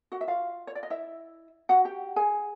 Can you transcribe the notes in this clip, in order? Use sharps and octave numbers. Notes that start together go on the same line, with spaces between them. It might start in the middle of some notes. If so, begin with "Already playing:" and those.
F#4 F#5
E5
F4 F5
C#5
D5
D#5
E4 E5
F#4 F#5
G4 G5
G#4 G#5